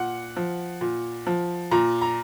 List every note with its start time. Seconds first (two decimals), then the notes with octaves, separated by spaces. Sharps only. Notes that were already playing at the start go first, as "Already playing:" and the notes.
Already playing: A#2 F#5
0.37 F3
0.81 A#2
1.27 F3
1.71 A#2 A#5
2.01 A#5